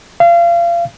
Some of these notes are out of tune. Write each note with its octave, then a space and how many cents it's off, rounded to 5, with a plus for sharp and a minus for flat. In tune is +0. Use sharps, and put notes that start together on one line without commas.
F5 -30